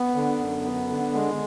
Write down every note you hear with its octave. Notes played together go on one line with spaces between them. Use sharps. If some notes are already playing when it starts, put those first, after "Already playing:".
Already playing: B3
D3
F#2
B3
D3
G#3